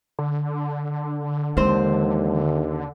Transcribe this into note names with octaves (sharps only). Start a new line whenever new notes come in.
D3
D#2 E3 G#3 C4 C5